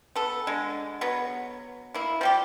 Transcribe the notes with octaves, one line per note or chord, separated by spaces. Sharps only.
B3 A4
D3 G#3
F#3 B3
A#3 E4
F3 G3 G4